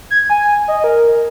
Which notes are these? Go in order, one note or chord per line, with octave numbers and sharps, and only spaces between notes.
G#6
G#5
D#5
A#4